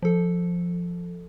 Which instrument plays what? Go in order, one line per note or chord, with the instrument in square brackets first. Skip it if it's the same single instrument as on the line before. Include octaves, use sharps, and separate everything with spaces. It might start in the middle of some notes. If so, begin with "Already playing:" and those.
[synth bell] F3 A4